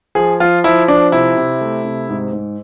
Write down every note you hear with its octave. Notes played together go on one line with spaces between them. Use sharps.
F3 G#4
F3 F4
F3 E4
F3 D4
C3 E4
C3
A3
C3
G#2
G#2